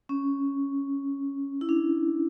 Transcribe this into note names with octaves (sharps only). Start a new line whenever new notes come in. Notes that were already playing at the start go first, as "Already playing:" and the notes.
C#4
E4
D4